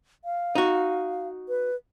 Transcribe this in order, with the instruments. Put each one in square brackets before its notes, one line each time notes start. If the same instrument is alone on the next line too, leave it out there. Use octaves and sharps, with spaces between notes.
[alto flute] F5
[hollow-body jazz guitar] D#4 F#4
[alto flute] B4